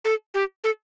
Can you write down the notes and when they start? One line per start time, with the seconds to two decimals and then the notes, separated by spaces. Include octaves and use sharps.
0.05 A4
0.34 G4
0.64 A4